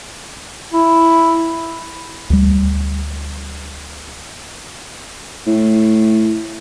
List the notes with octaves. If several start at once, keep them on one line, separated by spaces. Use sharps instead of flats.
E4
D2 G3
A2